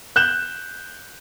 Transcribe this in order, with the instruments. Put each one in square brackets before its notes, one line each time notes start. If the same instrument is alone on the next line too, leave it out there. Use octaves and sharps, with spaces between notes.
[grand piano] F#6 G6 E7